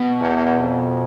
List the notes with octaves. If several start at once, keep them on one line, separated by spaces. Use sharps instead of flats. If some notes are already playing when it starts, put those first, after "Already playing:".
Already playing: B2
E2
F2